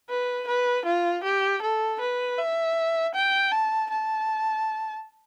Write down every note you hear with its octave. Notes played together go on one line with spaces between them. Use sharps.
B4
B4
F4
G4
A4
B4
E5
G5
A5
A5